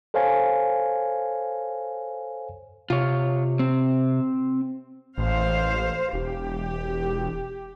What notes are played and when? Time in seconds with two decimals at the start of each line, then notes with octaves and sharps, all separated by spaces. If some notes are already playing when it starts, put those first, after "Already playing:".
0.14 A4 C5 C#5 F5 G#5
2.90 C3 F4 C#5
3.59 C4
5.18 A1 C5 F5
6.13 E1 G4